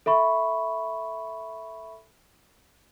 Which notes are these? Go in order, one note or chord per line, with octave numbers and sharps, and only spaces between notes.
A4 E5 B5 C#6